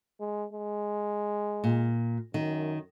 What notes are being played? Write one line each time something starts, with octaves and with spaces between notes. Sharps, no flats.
G#3
G#3
A#2
F#2 D#3